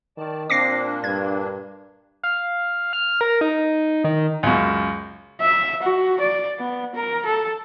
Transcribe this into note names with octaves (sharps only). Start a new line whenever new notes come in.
D#3 D5 A5
A#2 A#3 C4 D4 D6 A#6 C7
G2 G#6
F5
F6
A#4
D#4
D#3
C#2 F#2
E5
F#4
D5
B3
A#4
A4